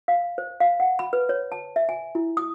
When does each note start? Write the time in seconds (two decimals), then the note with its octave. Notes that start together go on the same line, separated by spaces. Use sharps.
0.08 F5
0.38 C5
0.60 F5
0.80 F#5
0.99 B5
1.13 B4
1.29 C#5
1.52 A5
1.76 E5
1.89 G#5
2.15 E4
2.37 D#6